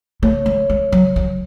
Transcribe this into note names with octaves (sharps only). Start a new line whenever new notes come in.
A3 C#5
G#3
G#3
F#3
F#3